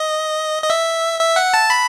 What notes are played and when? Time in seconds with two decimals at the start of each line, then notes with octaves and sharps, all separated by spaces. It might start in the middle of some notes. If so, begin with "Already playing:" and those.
Already playing: D#5
0.62 D#5
0.70 E5
1.20 E5
1.36 F#5
1.54 A5
1.70 B5